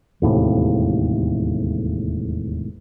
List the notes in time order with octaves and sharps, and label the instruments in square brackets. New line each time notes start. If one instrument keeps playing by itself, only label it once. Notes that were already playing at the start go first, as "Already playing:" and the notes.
[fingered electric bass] E1 D#2 A2 C3